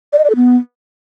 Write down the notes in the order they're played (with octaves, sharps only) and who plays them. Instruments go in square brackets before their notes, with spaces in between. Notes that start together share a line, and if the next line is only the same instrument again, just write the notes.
[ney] D5
D#5
D5
A4
B3